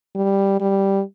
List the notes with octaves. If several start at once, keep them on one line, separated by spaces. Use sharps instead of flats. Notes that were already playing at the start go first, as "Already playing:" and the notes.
G3
G3